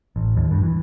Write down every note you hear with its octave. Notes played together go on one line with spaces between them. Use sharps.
A1
D#2
G2
E3